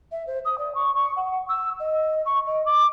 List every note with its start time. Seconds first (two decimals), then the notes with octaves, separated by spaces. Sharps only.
0.11 E5
0.27 C5
0.45 D#6
0.58 D5
0.74 C#6
0.94 C#6
1.16 F#5
1.48 E6
1.79 D#5
2.25 C#6
2.45 D#5
2.65 D6